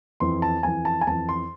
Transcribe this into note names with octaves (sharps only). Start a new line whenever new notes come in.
F2 E3 C6
A5
F2 E3 G#5
A5
G#5
F2 E3 A5
C6